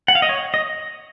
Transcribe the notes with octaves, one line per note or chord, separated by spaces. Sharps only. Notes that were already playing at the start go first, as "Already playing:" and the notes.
F#5
F5
D#5
C#5
D#5